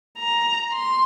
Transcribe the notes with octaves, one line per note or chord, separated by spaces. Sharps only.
A#5
C6